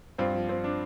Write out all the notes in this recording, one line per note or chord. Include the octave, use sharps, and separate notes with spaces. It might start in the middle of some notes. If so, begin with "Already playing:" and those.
G2 C4 F4
F3
C4
D4